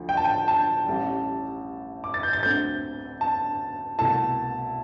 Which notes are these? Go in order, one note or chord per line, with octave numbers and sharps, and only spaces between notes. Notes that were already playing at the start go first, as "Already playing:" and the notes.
Already playing: D2 D3 F3
G5
A5
G5
A5
A1 A2 G3
D6
A6
G6
A6
D2 D3 A3 C4 G6
A5
C2 B2 A3 E4 A5